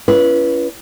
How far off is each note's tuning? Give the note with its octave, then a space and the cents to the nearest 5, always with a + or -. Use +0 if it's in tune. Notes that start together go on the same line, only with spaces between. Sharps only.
C#4 +30 E4 +45 B4 -20